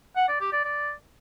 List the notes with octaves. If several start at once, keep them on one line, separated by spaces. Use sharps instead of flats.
F#5
D5
G4
D5
D5